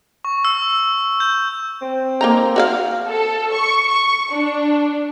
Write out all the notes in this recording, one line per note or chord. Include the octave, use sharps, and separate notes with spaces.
C#6
E6
G6
C4
A#3 D#4 A#5
F#4 E5 F5
A4
C#6
C#6
D4